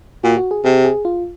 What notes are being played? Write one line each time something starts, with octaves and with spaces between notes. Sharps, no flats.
A#2 F#4
F#4
G#4
C3 G#4
G#4
F4